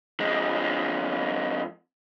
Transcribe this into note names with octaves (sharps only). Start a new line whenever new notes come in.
F2 G#3